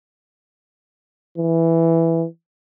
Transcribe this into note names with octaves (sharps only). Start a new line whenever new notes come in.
E3